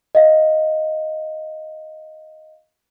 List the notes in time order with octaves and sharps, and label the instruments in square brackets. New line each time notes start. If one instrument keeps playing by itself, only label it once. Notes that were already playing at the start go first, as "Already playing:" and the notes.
[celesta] D#5 F5